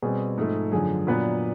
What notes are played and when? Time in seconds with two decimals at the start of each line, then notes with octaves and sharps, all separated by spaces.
0.02 B2 G3 C4 G#4
0.38 G#2 F3 A3
0.72 F#2 D3 F3 G#4
1.07 A#2 F#3 B3 D4 B4